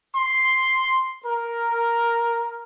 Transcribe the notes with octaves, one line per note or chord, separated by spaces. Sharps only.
C6
A#4